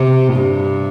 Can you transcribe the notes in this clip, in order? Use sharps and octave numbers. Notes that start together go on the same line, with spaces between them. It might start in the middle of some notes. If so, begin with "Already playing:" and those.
Already playing: C3
G2